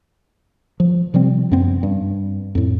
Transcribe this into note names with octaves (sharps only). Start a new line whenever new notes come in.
F3
C3 F3 G3 C4
F#2 B3 C4
G2
F2 A2